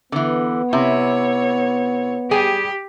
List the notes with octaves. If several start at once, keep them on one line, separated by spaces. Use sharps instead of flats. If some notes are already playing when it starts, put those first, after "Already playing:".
D3 E3 B3
C3 E4 C#5
G3 G4 G#4 G#5